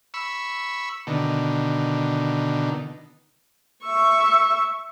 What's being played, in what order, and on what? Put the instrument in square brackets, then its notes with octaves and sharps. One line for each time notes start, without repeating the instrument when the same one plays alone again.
[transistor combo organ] B5 C#6 E6
B2 D3 D#3
[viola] E5 C#6